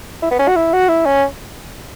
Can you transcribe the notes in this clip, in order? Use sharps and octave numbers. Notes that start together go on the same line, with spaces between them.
E4
B3
C#4
F#4
E4
F#4
E4
C#4